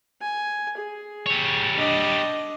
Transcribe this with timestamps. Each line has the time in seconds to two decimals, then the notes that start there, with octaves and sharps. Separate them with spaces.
0.21 G#5
0.77 G#4
1.26 G3 C#5
1.76 D4 D#5